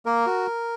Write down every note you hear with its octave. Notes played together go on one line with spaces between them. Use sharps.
A#3 A#4
F#4